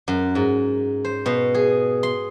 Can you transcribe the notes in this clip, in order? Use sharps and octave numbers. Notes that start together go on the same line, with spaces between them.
F#2
G#2
C5
B2
G#4
C6